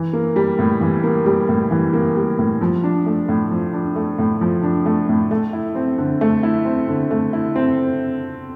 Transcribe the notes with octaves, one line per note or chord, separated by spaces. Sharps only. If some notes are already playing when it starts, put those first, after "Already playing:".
Already playing: E3
A#3
G3
A2
E3
A#3
G3
A2
E3
A#3
G3
A2
F3
D4
A3
A2
F3
D4
A3
A2
F3
D4
A3
A2
A3
E4
C4
D3
A3
E4
C4
D3
A3
E4
C4